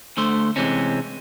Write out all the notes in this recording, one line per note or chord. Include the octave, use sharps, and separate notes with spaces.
D2 D3 A3 C5
C3 E3 G#3 C4 C#4